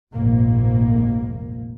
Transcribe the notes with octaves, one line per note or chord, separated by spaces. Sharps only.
F1 A#1 G#2 A#3